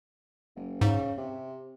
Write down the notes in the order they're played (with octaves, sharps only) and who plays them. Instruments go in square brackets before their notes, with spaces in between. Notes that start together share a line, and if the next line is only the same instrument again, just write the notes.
[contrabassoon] F#1
[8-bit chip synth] G#2 [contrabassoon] C#3
[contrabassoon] C3